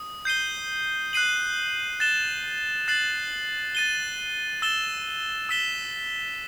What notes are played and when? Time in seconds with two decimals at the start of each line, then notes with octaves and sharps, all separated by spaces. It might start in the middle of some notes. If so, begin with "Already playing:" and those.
Already playing: D#6
0.25 G6 C7 D#7 G7
1.13 F#6 C7 D#7 F#7
2.00 F#6 A6 E7 G7
2.88 F#6 A6 C7 F#7
3.75 A6 D#7 G7
4.62 E6 A6 E7 G7
5.49 E6 B6 E7 G7